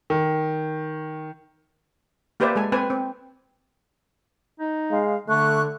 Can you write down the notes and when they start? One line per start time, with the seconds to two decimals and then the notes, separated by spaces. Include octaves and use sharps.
0.10 D#3
2.40 A#3 G4 B4 C5 D5 E5
2.56 G#3 A4 G#5
2.72 C4 B4 C5 G#5
2.90 C4
4.60 D#4
4.91 G#3 F5
5.28 D3 A3 C#6 F#6